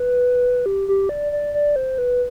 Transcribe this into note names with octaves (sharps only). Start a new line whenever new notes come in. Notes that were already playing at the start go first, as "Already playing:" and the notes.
Already playing: B4
G4
G4
D5
D5
D5
C5
B4